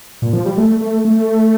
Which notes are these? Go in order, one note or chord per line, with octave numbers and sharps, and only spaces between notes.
A#2
F3
G3
A3
A3
A3